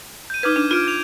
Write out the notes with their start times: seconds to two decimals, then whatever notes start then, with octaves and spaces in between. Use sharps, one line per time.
0.30 G6 D#7
0.43 D#4 B4 D6 F6 G#6
0.56 D4
0.71 F4 F6 D7 D#7
0.87 G#6 D7 F7